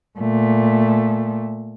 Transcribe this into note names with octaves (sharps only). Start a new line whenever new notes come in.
A#2 A3